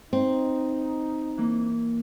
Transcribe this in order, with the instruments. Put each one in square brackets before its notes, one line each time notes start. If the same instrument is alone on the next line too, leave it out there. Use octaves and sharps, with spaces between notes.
[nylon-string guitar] C4 [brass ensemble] D#4
[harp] E3 A#3